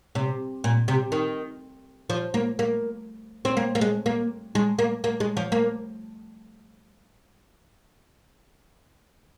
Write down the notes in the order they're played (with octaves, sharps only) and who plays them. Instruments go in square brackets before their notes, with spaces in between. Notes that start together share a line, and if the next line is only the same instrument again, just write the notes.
[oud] C3
A#2
C3
D#3
F3
A#3
A#3
C4
A#3
A#3
G#3
A#3
G#3
A#3
A#3
G#3
F3
A#3